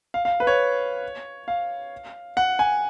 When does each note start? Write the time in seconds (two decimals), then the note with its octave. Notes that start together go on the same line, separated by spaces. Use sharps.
0.14 F5
0.25 F5
0.40 B4
0.47 C#5
1.48 F5
2.37 F#5
2.59 G#5